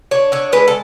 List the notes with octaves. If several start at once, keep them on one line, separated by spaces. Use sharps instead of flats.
D4 C#5
D3 C#5
G#3 B4
A4